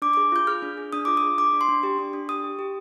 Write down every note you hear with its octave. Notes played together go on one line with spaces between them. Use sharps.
D4 D6
G#4 D6
F4 G6
G#4 F6
D4
G#4
D4 D#6
F4 D6
D#6
G#4
D4 D6
D4
C6
D4
G4
D4
D4
G4 D#6
G4
G4